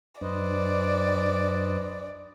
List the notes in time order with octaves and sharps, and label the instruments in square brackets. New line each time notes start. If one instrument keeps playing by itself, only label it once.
[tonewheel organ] F#2 F#3 D4 [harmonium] B4 C5 D#5 [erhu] D5